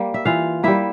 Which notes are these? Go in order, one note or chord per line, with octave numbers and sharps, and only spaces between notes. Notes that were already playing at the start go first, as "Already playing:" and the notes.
Already playing: G3 A#3
E5
E3 F4 F5
G3 A#3 E4 E5